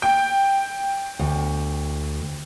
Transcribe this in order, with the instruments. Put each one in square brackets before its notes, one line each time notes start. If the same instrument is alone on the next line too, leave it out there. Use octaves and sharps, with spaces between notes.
[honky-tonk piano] G5
[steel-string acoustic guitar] D2